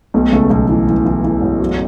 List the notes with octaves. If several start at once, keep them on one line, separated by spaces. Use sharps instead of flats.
B1 B2 A3
C#2 C#3 A3
B1 B2 A3
E3
E3
E3
E3
A1
F#2